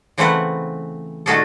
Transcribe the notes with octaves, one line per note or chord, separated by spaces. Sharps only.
C#3 E3 A3 C4 B4 F#5
A#2 D#3 A3 F#4 G#4 A4